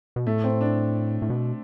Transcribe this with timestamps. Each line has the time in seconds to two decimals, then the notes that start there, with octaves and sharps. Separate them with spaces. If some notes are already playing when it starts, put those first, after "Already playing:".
0.16 B2
0.26 A2 A3
0.44 C4
0.61 D4
1.22 A2
1.30 B2